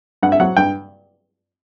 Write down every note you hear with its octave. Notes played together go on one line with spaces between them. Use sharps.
G2 F#5
E5
F#3 C4 F#5
G2 G5